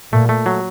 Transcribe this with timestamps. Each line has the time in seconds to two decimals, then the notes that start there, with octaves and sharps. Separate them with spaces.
0.12 A#2 A3
0.29 A3
0.46 F#3